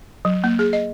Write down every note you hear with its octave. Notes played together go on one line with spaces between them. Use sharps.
F#3
A#3
G#4
D#5